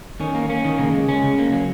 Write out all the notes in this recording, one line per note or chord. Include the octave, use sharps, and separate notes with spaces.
D#3 C#4
A#3
A#3 C#4
D#3
C#3 A#3
G#3
G#3 C#4
C#3
A#3
F#3